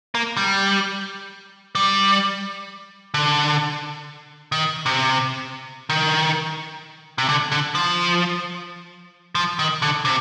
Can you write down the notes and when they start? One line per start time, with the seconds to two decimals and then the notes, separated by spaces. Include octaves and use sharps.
0.15 A#3
0.37 G3
1.75 G3
3.14 D3
4.52 D#3
4.86 C3
5.90 D#3
7.18 C3
7.29 D3
7.52 D3
7.75 F3
9.35 F3
9.59 D#3
9.82 D3
10.05 C3